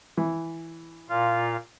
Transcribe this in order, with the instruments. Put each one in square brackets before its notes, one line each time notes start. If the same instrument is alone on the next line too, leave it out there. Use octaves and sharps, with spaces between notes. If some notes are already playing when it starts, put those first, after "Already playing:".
[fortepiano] E3
[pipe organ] A#2 F4 F5